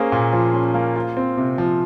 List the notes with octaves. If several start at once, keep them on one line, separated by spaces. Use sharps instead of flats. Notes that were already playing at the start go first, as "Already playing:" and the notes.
Already playing: A#3 C#4 G#4 C5
A#2
F3
C#4
A#3
F4
C4
C3
F3